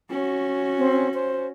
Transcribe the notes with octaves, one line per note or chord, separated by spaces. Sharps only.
C#4 F#4
C4
C5